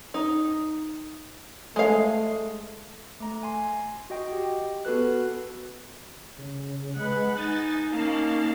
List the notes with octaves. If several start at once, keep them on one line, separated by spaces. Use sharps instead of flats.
D#4
G#3 A3 F5
A3 A#5
G#5 C6
F#4 D#5 G5
G4
B3 F#4 A4 B4 F#6
C#3
G#3 B4 F#5
D#4 G#5 A6
A#3 C#4 D#4 F5 A5